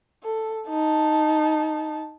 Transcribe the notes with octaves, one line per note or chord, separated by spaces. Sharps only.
A4
D#4 A5